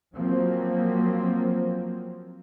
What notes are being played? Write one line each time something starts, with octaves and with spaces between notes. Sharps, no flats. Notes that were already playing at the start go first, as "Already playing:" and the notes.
F3 F#3 A#3 C4